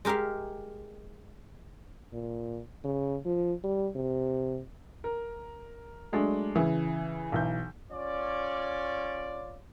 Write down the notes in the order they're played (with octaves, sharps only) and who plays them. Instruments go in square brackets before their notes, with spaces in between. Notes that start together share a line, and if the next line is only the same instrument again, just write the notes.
[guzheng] G#3 G4 A#4 E5 F5
[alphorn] A#2
C#3
F3
G3
C3
[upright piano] A#4
F#3 G#3 A3 D4
C#3 E3
B1 E3 G6
[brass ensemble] C#4 F4 C#5 D5